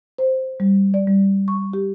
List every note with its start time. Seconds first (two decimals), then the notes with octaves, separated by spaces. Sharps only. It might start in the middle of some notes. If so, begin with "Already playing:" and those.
0.18 C5
0.60 G3
0.94 D5
1.07 G3
1.48 C#6
1.74 G4